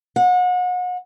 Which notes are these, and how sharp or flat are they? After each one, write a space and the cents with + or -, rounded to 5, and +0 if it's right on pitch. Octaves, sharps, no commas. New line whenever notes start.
F#5 -35